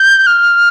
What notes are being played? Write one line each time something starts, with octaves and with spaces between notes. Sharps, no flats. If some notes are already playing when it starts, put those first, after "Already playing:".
Already playing: G6
F6